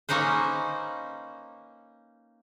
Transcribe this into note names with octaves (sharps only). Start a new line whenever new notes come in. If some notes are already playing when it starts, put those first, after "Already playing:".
A#3 C#4 D#4 B4 C5